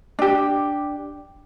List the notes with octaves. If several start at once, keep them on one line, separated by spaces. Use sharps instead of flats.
D4 G4